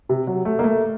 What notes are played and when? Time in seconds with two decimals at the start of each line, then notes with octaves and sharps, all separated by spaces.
0.09 C3
0.27 F#3
0.45 A3
0.59 A#3
0.64 A3